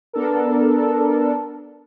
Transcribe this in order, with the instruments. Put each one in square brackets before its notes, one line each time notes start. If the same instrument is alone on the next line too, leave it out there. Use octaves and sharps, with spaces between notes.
[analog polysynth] B3 D4 A4 A#4